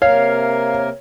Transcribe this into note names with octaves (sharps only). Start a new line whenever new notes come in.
C3 A#3 A#4 C#5 F5